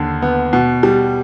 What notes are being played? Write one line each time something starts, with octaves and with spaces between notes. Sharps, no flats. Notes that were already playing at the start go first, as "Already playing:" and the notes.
Already playing: D#2 D3
B3
B2
G3